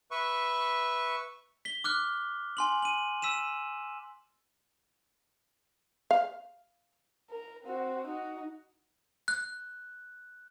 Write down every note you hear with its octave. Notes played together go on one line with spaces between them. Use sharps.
B4 E5 C#6
B6 G7
D6 F6 F#6
G#5 C6 F#7
D#7 F#7
E6 B6 D#7 E7
F5
A#4
C4 F#4
D#4 F#4
F#6